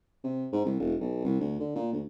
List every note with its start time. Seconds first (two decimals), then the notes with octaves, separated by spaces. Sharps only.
0.24 C3
0.52 G#2
0.65 C2
0.79 E1
1.00 B1
1.24 C2
1.40 D2
1.60 D3
1.75 A#2
1.93 D2